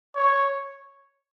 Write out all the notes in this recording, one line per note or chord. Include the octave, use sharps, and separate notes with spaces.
C#5